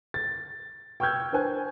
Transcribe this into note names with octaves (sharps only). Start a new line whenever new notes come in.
A6
G5 C#6 E6 F6 G6 G#6
D4 B4 C5 G#5 F#6